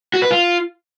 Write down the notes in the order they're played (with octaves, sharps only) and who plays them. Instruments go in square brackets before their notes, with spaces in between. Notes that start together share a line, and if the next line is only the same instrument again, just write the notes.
[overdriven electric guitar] F#4
B4
F4